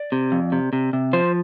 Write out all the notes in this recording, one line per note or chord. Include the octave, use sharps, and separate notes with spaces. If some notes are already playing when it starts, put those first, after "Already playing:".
Already playing: D5
C3
F2
C3
C3
C3
F3 C5